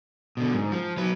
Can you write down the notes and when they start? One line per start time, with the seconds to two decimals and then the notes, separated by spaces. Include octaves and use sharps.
0.37 B2 D3
0.54 G#2
0.72 F3
0.97 F#3 B4